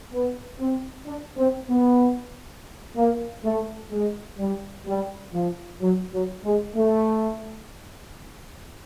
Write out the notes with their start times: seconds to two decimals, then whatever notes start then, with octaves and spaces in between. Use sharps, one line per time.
0.12 B3
0.59 C4
1.06 D4
1.38 C4
1.70 B3
2.96 A#3
3.44 A3
3.91 G#3
4.39 G3
4.87 G3
5.34 F3
5.81 F#3
6.13 F#3
6.45 G#3
6.76 A3